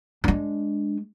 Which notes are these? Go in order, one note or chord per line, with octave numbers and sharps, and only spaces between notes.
G#3 D4